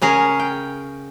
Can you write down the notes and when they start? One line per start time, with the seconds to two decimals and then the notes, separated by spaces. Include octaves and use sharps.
0.02 C#3 C#4 G#4 A#4
0.40 G5